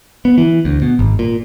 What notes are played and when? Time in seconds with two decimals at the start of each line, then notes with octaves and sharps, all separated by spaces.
0.25 B3
0.38 E3
0.65 D2
0.82 B2
0.99 G#1
1.19 A#2